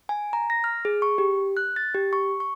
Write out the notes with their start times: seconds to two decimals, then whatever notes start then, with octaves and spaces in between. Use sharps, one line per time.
0.09 G#5
0.33 A#5
0.50 A#6
0.64 F6
0.85 G#4
1.02 C#6
1.18 G4
1.57 F#6
1.76 A6
1.94 G4
2.13 C#6
2.40 C#6